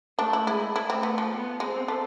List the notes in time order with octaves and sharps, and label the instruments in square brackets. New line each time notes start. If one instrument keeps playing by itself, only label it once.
[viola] A3 [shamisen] D4
[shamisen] E4
[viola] G#3 [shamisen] E4
[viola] A3 [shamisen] E4
[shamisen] C4
B3
F3
[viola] B3
[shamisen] G#3 [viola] C4
[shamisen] A3